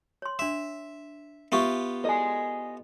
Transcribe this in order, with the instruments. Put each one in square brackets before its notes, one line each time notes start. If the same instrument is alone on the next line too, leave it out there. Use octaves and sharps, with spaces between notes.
[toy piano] C#5 C6
[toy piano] D4 C6 [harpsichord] E5
[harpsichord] B3 F4 G4 [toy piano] E5 C#6
[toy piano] E4 A4 D5 [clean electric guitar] D#5 G#5